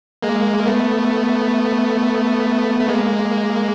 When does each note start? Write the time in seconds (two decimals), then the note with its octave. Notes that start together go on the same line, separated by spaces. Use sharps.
0.23 G#3 A#3
0.67 A3 B3
2.80 A3
2.88 G#3 A#3